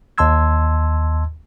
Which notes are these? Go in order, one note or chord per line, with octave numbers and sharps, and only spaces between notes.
D#2 D#5 A5 C6 E6 G#6